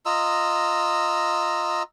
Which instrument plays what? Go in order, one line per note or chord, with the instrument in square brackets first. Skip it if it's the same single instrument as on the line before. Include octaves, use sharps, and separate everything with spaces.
[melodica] F4 D#5 A#5 E6